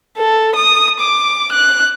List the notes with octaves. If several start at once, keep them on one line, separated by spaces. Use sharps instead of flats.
A4
D#6
D6
F#6